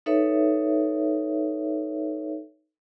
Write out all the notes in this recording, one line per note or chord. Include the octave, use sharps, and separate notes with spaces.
D#4 A4 B4 C#5 E5